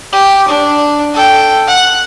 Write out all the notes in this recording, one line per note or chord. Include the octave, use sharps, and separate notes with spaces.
G4
D4
A4 G5
F#5